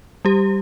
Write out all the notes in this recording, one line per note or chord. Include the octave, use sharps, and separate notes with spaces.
G3 G4